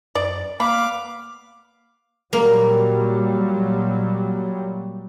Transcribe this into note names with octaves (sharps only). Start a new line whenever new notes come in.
F#2 D5
A#3 B3 F5 B5 D6
A#2 F#3 G3 A#3